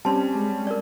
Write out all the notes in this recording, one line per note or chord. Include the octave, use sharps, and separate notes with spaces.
G3 C4 C#4 A5 C6
G#3
A#4 D5